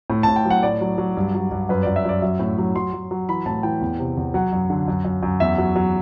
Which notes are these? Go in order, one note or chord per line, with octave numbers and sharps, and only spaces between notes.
A2
A2 A5
G5
F#3
F#5
A2 D5
F#3
F#3
G2
F#3
G2
F#2 B4
F#2 D5
E5
F#2 D5
F#3 E5
A2
F#3
F#3 C6
F#3
F#3
E3 B5
A2 A5
E3 G5
E2
C3
E2
F#3 F#5
F#2
D3
F#2
F#2
F#2
E2 E5
F#3
F#3